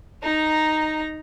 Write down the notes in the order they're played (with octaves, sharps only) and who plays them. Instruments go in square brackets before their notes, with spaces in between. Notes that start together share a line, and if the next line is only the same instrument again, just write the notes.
[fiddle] D#4 A#5